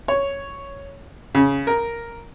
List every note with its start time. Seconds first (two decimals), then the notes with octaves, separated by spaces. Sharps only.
0.08 C#5
1.35 C#3
1.67 A#4